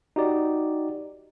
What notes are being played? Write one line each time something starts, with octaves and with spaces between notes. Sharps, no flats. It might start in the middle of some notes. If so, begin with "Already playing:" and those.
D#4 F#4 G4 D5